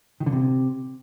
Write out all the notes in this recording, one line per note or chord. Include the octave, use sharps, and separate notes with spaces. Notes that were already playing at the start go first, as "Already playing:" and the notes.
D#3
D3
C3